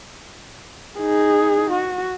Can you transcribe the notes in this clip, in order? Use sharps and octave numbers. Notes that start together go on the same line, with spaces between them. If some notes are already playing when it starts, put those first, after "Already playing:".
D#4 G#4
F#4